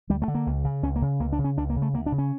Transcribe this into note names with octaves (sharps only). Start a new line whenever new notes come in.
D2 G3
A3
D3
A#3
C#2
C#3
C#2 C#4
A#3
C#3
C#2 A#3
D4
C#3
C#4
C#2 D4
A#3
C#3
A3
D2 A#3
D4
C#3
C#4